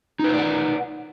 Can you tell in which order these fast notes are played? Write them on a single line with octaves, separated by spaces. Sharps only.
D#4 B4 C5 D5 F#5